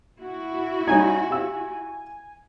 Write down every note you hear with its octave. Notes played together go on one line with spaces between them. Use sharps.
E4 F#4
G3 C#4 D#4 G#5
G4 F5 E6